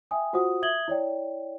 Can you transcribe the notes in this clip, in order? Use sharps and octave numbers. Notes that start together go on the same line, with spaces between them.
E5 G5 G#5 D#6
F4 F#4 C5 F#5 D#6
E5 D#6 G#6 F#7 G7
E4 C#5 D5 G5